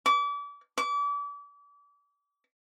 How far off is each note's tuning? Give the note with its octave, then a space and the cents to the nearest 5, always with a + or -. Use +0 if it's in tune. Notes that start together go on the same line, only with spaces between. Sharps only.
D6 -35
D6 -35